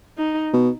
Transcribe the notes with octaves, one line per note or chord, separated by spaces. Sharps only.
D#4
B2